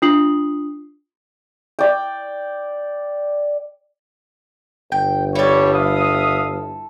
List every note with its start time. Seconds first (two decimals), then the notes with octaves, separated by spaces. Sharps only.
0.02 D4 F4 D#6 C7 F#7
1.79 D5 G5
4.92 G1 G5
5.35 G3 E4 A4 C#5
5.75 E5 F5 D#6